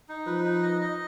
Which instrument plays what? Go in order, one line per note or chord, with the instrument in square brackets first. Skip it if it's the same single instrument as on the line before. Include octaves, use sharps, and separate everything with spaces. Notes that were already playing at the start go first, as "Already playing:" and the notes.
[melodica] D#4
[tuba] F3 [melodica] B4
[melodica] D#4
D#5
D#5